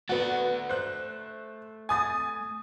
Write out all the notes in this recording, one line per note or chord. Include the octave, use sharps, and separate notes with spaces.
A3 B3 F#4 D5
C5 F#6
G#5 D#6 A6